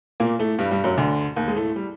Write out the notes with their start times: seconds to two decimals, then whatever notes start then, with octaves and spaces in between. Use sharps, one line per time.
0.20 A#2 A#3
0.39 A2 A3
0.59 G2 G3
0.71 G2 G3
0.84 F#2 F#3
0.97 D2 D3
1.36 D#2 D#3
1.47 G#3
1.56 A2 A3
1.76 G3